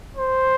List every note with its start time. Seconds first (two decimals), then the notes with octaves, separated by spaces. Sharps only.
0.17 C5